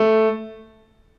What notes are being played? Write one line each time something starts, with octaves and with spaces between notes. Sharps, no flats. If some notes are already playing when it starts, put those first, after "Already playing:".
Already playing: A3